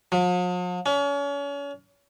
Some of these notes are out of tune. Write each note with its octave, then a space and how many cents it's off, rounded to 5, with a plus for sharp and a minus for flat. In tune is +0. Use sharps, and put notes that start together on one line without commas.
F3 +45
C#4 +35